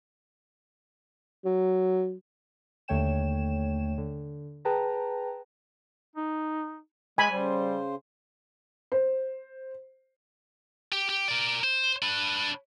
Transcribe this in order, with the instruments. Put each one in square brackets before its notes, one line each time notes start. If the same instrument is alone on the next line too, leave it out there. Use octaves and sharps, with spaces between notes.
[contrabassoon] F#3
[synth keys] D#2 D3 A3 C#5 G5 E7
D3
G#4 B4 G5 A5 A#5
[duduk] D#4
[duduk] G#3 [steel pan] G#5 B5
[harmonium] C#3 C5 [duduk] G3
[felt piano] C5
[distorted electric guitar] G4
G4
A#4 D5
C5
D4 B4